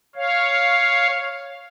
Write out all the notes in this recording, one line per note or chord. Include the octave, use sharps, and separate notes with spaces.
C#5 F5